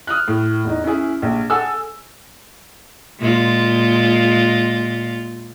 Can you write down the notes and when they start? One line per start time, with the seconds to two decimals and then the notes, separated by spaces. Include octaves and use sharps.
0.07 D#6 F6 F#6
0.28 A2
0.65 E2 D#4
0.84 C#4 E4 G#4
1.22 A#1
1.50 G#4 A4 F#5 G#5 E6
3.19 A#2 G#3 F4